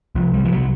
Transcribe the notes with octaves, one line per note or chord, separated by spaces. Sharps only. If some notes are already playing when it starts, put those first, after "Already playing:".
C2 F3
G3
C2
F3
F#3